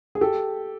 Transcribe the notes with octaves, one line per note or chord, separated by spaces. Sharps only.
G#4
G4 A4